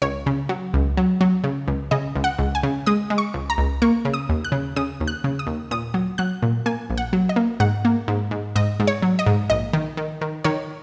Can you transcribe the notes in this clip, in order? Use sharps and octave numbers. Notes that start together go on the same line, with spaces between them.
C#2 C#5
C#3
F#3
C#2
F#3
F#3
C#3
C#2
C#3 D#5
C#2
F#5
C#2
G#5
C#3
G#3 D#6
G#3
C#6
C#2
A#5
C#2
A#3 C#6
C#3
D#6
D#2
F#6
C#3
C#3 D#6
D#2
F#6
C#3
D#6
D#2
A#2 D#6
F#3
F#3 F#6
A#2
A#3 G#5
A#1
F#5
F#3
D#5
A#3
G#2 F#5
A#3
G#2
G#2
G#2 D#5
G#2
C#5
F#3
D#5
G#2
A#1 D#5
D#3
D#3
D#3
D#3 C#5